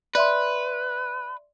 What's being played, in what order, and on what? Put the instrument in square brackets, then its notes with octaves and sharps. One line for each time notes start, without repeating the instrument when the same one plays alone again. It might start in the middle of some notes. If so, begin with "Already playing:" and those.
[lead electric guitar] B4 [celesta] D5 E5 C6